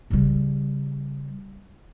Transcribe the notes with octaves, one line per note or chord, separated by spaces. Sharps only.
C#3 G3